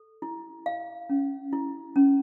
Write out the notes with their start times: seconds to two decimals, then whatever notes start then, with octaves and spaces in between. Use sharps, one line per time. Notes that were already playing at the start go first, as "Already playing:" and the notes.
Already playing: A4
0.22 E4
0.66 F5
1.10 C#4
1.53 E4
1.96 C#4